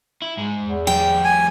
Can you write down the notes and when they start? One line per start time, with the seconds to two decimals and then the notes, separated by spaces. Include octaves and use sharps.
0.22 E4
0.37 G#2 G#3
0.61 E2
0.87 F3 G3 G5
1.24 G#5